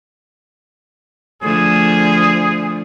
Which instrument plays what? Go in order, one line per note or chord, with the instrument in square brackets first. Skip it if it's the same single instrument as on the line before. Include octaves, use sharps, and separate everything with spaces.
[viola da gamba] D3 F3 A3 [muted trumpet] G#4